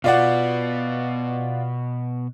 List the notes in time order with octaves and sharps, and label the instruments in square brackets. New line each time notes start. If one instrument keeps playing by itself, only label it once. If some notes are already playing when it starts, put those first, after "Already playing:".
[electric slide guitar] B2 B3 [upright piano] F4 D5 F#5